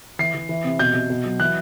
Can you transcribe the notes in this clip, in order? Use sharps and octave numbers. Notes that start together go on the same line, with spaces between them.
E3 C7
E3
E3
C3
B2 G6
B2
B2
F#3
E3 F#6